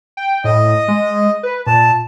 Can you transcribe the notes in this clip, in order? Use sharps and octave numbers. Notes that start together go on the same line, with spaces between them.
G5
A2 D#5
G#3
B4
A#2 A5